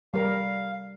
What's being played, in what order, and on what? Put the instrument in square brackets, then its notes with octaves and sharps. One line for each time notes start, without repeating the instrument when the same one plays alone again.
[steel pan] G3 A#4 [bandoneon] F5